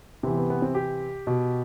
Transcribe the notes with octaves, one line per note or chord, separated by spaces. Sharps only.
C3 E3 B3
B3
B3
C4
G4
B2